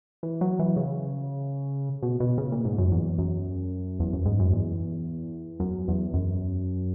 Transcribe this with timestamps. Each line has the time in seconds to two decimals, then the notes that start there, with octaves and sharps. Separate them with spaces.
0.23 E3
0.41 F#3
0.59 E3
0.76 C#3
2.03 B2
2.20 B2
2.38 C#3
2.52 A#2
2.65 G#2
2.78 F#2
2.92 E2
3.18 F#2
3.99 E2
4.13 F#2
4.26 G#2
4.39 F#2
4.53 E2
5.60 F#2
5.88 E2
6.14 F#2